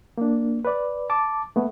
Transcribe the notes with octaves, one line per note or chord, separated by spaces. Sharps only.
A#3 D4
B4 D5
A5 D6
A3 B3